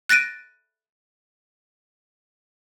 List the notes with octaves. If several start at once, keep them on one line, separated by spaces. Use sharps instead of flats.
F#6 A6 A#6 D7 D#7